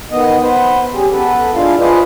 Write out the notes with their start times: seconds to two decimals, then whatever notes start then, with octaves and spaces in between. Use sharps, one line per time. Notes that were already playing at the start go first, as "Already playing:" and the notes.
0.11 D#3 B3 D#5
0.41 B3 B4 C5
0.93 G3 C#4 G4 G#4
1.10 B3 A4 B4
1.54 G#3 D4 E4 F4 F5
1.79 F4 G#4 B4 C5 D5 D#5